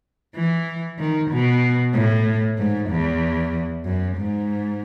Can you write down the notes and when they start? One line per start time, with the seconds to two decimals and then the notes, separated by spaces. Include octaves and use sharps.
0.35 E3
0.99 D#3
1.31 B2
1.93 A2
2.58 G#2
2.90 E2
3.85 F#2
4.18 G#2